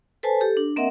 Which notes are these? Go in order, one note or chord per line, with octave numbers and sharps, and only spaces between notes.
A4 B4 C5 G#5 A5
G4 A4
D4
A#3 C4 A#4 D#5 E5 F#5